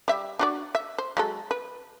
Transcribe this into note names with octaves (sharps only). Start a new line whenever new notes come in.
G3 E5
D4 F#4 D5
E5
C5
F#3 G#3 A4
B4